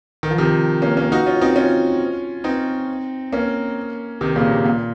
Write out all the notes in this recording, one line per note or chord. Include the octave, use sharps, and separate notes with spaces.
D#3
F3
C3 D#3
A#3 C#4
A#3 C#4
D#4 F#4
C#4 F4
C4 D#4
C#4 F4
C4 D#4
A#3 C#4
C3 D#3
A#2 C#3
C3
A#2